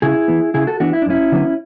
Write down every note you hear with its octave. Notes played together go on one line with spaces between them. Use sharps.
C#3 E4 G#4
E3 B3
C#3 E4 G#4
F#4 A4
E3 B3 D4 F#4
E4
D4
F#2 C#4 E4
D3 F#3 B3